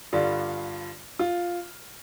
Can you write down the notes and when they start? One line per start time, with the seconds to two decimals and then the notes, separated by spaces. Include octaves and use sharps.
0.13 G2 D3 G3 F4
1.19 F4